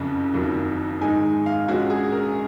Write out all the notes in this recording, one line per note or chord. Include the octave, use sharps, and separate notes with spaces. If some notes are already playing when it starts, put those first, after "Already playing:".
Already playing: F#1 F2 C#3
F#1 F2 D#3 F#3 A#3
G#2 D#3 G#3 D#4 G#5
F5
A#1 A#2 G#3 C#4 F#4
G#4
A#4